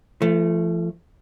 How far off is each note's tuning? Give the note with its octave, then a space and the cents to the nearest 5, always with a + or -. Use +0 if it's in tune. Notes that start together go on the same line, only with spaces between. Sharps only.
F3 -40 A3 +0